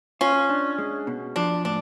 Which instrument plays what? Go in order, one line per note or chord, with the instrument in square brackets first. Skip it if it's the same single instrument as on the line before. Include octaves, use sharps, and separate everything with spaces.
[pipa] C#4 [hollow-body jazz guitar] F4
[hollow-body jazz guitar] D4
G#3
B2
[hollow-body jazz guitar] F3 [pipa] D4
[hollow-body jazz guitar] A2 [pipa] D4